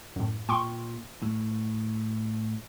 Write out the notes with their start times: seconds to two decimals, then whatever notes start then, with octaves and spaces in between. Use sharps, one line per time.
0.16 F#2 A2
0.49 A#2 G5 C6 C#6
1.22 A2